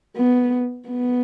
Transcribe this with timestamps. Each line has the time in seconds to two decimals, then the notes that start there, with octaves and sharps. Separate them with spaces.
0.17 B3
0.88 B3